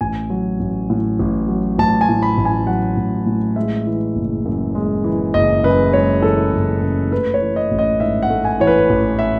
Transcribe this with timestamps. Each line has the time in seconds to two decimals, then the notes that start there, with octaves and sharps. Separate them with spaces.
0.01 A1 G#5
0.30 F#3
0.60 A1
0.90 A2
1.20 A1
1.48 F#3
1.79 A1 A5
2.01 G#5
2.09 A2
2.23 B5
2.38 A1
2.45 G#5
2.67 F#3 F#5
2.97 A1
3.26 A2
3.56 G#3 E5
3.87 E3
4.15 F#1
4.45 F#2
4.75 G#3
5.04 E3
5.34 F#1 D#5
5.63 F#2 B4
5.93 G#3 C#5
6.22 E3 A4
6.53 F#1
6.82 F#2
7.11 A3 B4
7.34 C#5
7.41 E3
7.56 D#5
7.71 A1
7.79 D#5
8.00 G#2 E5
8.23 F#5
8.30 A3
8.45 G#5
8.60 E3 C#5
8.67 B4
8.90 A1
9.19 E5